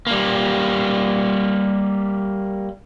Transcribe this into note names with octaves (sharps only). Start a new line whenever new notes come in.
G3 A#3